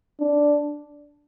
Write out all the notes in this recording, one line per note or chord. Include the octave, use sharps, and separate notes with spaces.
D4